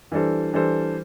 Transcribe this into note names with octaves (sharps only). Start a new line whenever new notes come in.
E3 G3 D4 A4 C5
E3 G3 D4 A4 C5